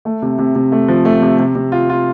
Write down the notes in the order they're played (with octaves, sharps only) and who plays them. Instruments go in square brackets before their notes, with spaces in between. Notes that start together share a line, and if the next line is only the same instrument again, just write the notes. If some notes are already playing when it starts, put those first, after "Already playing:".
[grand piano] A3
C3
C3
C3
A3
F3
A3
C3
C3
C3
F4
F4